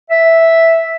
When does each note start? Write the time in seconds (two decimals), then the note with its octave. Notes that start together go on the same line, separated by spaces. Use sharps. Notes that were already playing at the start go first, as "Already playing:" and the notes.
0.10 E5